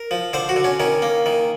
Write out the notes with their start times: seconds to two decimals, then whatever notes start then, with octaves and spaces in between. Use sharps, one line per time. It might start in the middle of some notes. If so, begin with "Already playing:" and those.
Already playing: A#4
0.11 F3
0.33 D3 C5
0.49 F#4
0.56 D3
0.64 C#4
0.80 D#3 C#4
1.02 A#3
1.26 D#3